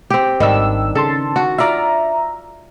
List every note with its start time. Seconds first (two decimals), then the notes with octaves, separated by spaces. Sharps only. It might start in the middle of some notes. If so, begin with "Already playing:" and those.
0.10 C4 G4
0.40 G#1 D#3 G3 D4 E6
0.95 C#3 A4 A5 C6
1.36 F#4
1.58 F4 D5 E5 A#5